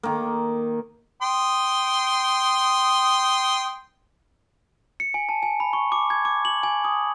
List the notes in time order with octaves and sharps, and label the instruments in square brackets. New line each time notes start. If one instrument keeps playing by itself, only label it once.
[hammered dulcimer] D#3 A#3
[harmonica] G5 C6 D#6
[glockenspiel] C#7
G#5
A5
G#5
B5
C#6
D6
G#6
D6
F#7
G#5
D#6